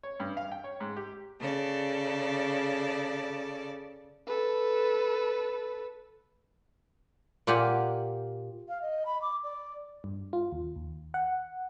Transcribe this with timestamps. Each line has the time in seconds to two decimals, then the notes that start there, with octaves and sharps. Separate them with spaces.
0.03 C#5
0.20 G2
0.37 F5
0.52 G5
0.64 C#5
0.80 G#2
0.97 G4
1.40 C#3 A4 D5
4.27 A4 B4
7.47 A#2 F4 G4 F#5 G#5
8.68 F5
8.82 D#5
9.06 B5
9.22 D6
9.44 D5
10.04 G2
10.33 F4
10.52 D#2
10.76 D#2
11.14 F#5